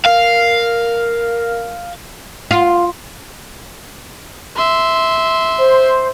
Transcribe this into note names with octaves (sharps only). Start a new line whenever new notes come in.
A#4 F5
F4
E5 C6
C5